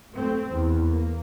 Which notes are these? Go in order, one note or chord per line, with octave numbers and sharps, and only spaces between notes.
A3 C4
E2
A#3